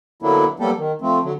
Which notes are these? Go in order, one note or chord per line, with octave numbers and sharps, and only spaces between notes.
D3 F#3 A#3 B3 D4 E4
F#3 G3 A#3 B3 G4 A4
D#3
F3 A3 C4
D3 F#3